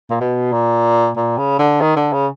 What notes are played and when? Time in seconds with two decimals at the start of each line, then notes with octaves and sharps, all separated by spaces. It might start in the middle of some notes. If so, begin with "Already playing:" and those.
0.11 A#2
0.21 B2
0.53 A#2
1.17 A#2
1.38 C#3
1.59 D3
1.81 D#3
1.97 D3
2.13 C#3